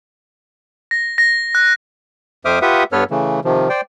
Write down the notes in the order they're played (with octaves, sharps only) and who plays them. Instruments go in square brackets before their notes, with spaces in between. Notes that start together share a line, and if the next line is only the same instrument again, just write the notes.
[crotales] A#6
A#6
F#6
[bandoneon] F2 C5 E5 D6 D#6 F6
F4 G4 B4 E5 F#5 D#6
G2 B3 A4 B4 C#5 F6
C#3 E3 A3
C3 D#3 F3
C5 D5 G5